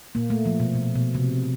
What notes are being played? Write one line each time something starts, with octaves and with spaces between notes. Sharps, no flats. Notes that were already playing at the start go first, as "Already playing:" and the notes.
A#2 A#3
A3
F3
B2
B2
B2
C3